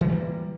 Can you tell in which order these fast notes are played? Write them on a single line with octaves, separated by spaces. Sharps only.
E3 G#3 G3 A#3